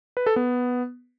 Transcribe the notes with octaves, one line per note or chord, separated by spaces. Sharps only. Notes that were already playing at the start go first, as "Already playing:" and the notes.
B4
A4
B3